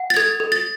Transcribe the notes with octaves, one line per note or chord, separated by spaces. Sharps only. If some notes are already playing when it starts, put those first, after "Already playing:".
Already playing: F#5
A6
A4 G#6
A4
A6